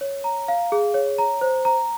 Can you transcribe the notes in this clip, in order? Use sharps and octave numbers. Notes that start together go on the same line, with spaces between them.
C#5
A#5
F5
G#4
C#5
A#5
C5
A#5